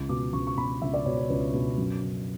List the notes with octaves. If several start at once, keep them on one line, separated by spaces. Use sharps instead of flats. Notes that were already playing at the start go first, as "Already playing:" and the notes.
Already playing: C#2
B2 D6
C#2 C#6
C#6
B2 B5
C#2 E5
D5
B2 C#5
C#5
C#2 B4
B2
F#2
C#3